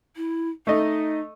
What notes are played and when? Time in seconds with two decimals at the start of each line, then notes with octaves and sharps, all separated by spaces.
0.16 E4
0.67 A3 D#4 D#5